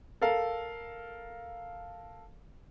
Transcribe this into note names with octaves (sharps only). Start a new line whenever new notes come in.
A4 A#4 F5